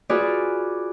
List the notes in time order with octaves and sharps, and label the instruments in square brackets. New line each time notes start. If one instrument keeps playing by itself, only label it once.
[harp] F4 F#4 G#4 B4 D5